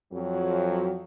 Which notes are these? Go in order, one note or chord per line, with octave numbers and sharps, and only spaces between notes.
F2 F#3